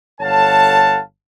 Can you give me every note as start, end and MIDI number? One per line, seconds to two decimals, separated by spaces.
0.21 1.00 31
0.21 1.00 69
0.21 1.00 73
0.21 1.00 77
0.21 1.00 78
0.21 1.00 81